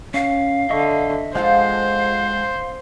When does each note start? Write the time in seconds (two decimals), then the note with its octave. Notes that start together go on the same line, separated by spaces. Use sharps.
0.14 C#4 F5
0.70 D3 D#5 E5 C#6
1.35 F3 G#3 F4 A4 C5 F5 F#5 G6